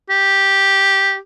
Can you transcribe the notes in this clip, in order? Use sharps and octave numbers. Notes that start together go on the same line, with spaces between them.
G4